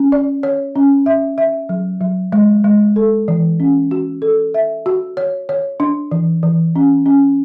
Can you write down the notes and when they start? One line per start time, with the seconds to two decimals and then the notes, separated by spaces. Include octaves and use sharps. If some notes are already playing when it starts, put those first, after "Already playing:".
Already playing: C#4
0.12 D5
0.43 C#5
0.76 C#4
1.06 E5
1.38 E5
1.69 F#3
2.01 F#3
2.32 G#3
2.64 G#3
2.96 A4
3.28 E3
3.60 C#4
3.91 F#4
4.22 A4
4.54 E5
4.86 F#4
5.17 C#5
5.49 C#5
5.80 D4
6.12 E3
6.43 E3
6.76 C#4
7.06 C#4